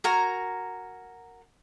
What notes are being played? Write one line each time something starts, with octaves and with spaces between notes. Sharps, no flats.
F#4 A#4 G#5 A#5